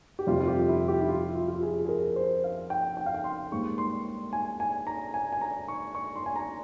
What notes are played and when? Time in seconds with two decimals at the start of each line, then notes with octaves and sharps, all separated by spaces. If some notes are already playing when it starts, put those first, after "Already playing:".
0.19 G4
0.27 F2 C3 G3 F4
0.40 F4
0.48 G4
0.68 E4
0.88 G4
1.01 E4
1.09 F4
1.35 F4
1.48 F4
1.55 G4
1.63 G#4
1.85 G#4
1.89 A#4
2.16 C5
2.44 F5
2.70 G5
2.97 G5
3.06 F5
3.14 G5
3.24 C6
3.52 G#2 G3 A#3 C#6
3.78 C6
4.33 G#5
4.60 G#5
4.87 A#5
5.14 G#5
5.32 G#5
5.41 A#5
5.68 C#6
5.95 C#6
6.16 C6
6.26 G#5
6.36 A#5